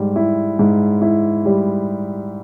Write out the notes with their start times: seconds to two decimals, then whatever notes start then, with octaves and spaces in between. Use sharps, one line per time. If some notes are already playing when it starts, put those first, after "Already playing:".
Already playing: G#2 G3
0.16 E4
0.59 G#2
1.02 E4
1.46 G3